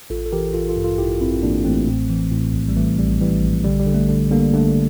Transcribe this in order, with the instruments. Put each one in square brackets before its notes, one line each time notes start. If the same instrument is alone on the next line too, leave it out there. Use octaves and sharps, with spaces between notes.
[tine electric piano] A1 F4 A4
A4
E3 G4 A#4
A1 F4 A4
F4 A4
G2
F4 A4
A1 E4 G4
A1 C4 E4
A1 A#3 D4
A1 A3 C4
A2
E3
A2
A#1
G3
E3 A3
A#1 G3
E3 G3
A#1
D3 G3
G3
D3
A3
D3
D3 G3 A#3
D3 A3